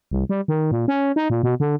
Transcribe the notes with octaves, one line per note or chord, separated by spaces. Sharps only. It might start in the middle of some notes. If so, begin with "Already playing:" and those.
C2
G3
D#3
A#2
C#4
D#4
A#2
B2
D3